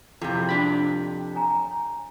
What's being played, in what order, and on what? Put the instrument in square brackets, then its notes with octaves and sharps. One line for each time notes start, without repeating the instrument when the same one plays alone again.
[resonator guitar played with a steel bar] F2 C3 [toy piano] E4 G#4
[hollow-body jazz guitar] D4 G5 B5
[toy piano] C#5 G#5 A#5